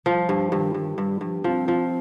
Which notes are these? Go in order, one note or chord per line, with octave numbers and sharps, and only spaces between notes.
F3 G3
G2
G2 D#3
G2 D#3
G2 G3
G2 F3
F3 C4
F3